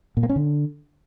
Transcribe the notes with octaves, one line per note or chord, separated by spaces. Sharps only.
A#2
A#3
C#4
D3